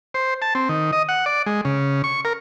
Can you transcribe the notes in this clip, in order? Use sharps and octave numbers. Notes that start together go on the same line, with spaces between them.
C5
A5
C4
D#3
D#5
F#5
D5
G#3
C#3
C#6
A#4